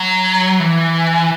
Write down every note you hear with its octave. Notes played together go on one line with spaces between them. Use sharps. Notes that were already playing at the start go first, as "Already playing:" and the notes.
Already playing: F#3
E3